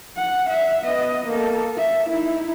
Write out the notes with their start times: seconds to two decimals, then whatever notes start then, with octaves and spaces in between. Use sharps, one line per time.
0.17 F#5
0.49 E5
0.85 B3 D#5
1.27 A#3 A4
1.78 E5
2.09 D#4 E4